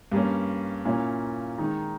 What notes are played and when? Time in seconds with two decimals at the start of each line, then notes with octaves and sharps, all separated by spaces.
0.12 G2 G3 A#3 C#4
0.85 A#2 A#3 C#4 E4
1.58 D#3 G#3 D#4